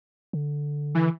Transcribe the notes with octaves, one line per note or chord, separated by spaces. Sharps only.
D3
E3